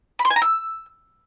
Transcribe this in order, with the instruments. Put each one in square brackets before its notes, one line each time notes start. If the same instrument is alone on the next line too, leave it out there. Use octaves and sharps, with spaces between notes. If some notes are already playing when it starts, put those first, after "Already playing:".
[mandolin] B5
C6
G#5
A#5
E6